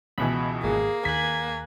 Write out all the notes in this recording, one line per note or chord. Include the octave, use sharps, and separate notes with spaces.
C#2 B2 E3 B5
G#1 A#2 A#3 G#4
D#2 G#5 F#6 B6